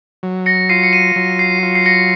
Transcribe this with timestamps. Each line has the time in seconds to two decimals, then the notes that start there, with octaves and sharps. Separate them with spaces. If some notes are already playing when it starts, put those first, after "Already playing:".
0.23 F#3
0.46 A#6 C#7
0.69 F4 C7 D#7
0.83 C#7
0.93 C7 D#7
1.16 F#3 C7
1.39 C7
1.63 F4
1.75 C7
1.86 A#6 C#7